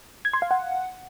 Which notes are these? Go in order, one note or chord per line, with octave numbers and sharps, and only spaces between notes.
G#6
C6
F5
F#5